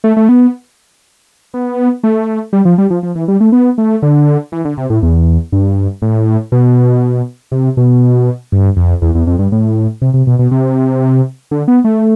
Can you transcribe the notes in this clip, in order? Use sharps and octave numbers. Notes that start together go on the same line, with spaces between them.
A3
A3
B3
B3
A3
G3
F3
G3
F3
F3
E3
G3
A3
B3
A3
D3
E3
D3
C3
A2
E2
G2
A2
B2
C3
B2
G2
F2
E2
E2
F2
G2
A2
C3
C3
B2
B2
C3
D3
B3
A3